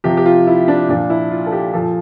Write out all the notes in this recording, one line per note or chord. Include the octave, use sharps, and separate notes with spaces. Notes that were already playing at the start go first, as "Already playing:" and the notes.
C3 F3 G4
G4
F4
E4
D4
A#2 F3 D4
E4
F4
A4
G4
A#2 F3 A4